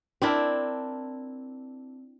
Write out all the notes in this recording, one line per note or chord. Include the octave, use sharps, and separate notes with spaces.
C4 D4 E4 A#4